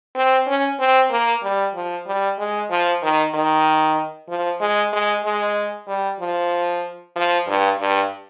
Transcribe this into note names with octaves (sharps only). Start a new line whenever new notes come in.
C4
C#4
C4
A#3
G3
F3
G3
G#3
F3
D#3
D#3
F3
G#3
G#3
G#3
G3
F3
F3
G2
G2